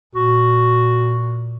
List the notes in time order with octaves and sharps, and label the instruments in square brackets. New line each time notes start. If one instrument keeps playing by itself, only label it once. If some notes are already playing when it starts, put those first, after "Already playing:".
[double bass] A#2 [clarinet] F#4